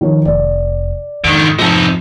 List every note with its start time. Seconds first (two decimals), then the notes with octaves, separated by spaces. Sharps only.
0.01 D#3 F3 C#5
0.25 F1 D5
1.24 F2 G#2 D3 D#3
1.59 C3 F3 D#4 A5